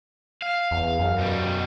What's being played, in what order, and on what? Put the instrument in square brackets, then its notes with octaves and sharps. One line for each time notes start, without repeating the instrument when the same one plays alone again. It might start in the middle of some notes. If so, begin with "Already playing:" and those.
[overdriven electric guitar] F5
[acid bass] E2
F#2
[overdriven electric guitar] B2 G3